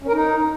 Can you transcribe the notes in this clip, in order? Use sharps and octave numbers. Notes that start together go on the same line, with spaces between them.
C#4
A#4
D#4